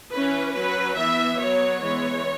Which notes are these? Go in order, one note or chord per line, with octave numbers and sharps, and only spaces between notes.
E3 C#4 B4
F#3 C#4 B4
E3 B3 E5
F#3 B3 C#5
E3 G#3 B3 C#5